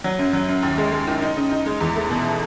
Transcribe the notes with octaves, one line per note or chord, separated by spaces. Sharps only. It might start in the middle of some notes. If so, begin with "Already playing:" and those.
F#3
F#2
F#3
F#2
D#2
G#3
G#3
D#3
D#4
C#3
D#4
G#3
E2
A3
B2